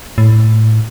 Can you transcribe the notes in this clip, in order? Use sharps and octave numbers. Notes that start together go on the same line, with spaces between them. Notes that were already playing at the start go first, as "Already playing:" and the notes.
A2